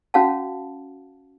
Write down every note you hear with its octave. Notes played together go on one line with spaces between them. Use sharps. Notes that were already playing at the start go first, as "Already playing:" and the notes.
C#4 F#4 F5 F#5 A5